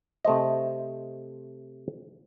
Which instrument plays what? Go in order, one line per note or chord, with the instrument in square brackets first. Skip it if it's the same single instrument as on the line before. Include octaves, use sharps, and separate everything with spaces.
[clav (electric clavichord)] C3 A3 C5 D#5